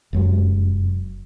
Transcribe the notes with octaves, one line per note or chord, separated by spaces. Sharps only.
F1 F#2 F#3 G#3